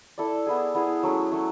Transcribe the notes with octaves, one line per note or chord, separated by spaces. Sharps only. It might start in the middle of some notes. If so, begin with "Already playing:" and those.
E4 A4 D5
B3 E4 G#4
B3 E4 G#4
F#3 A3 C#4
F#3 A3 C#4